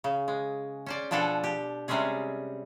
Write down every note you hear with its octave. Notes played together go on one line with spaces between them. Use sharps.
C#3
G#3
C#4 C5 D5
B2 F3 D4 G#4 A4 F#5
G4
C3 G3 G#3 C4 C#4 G#4